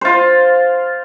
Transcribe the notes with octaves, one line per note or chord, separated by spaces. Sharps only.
F4 C5